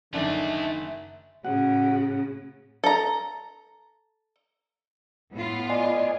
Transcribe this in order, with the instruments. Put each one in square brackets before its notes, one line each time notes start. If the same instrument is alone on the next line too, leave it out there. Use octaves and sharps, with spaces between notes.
[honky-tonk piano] F#1 D3 [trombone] D#3 [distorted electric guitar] A3 D5 [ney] E5
[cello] A2 C#3 [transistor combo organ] F#4 F#5
[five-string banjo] A4 A#5
[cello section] A2 B3 F4
[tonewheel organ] D5 D#5 G#5